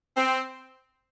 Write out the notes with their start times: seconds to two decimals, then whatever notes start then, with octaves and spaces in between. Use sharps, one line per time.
0.16 C4